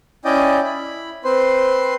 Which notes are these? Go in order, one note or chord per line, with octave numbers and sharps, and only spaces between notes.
C#4 E4 D5 D#5 G5
E4 B5
C4 B4 C5 C6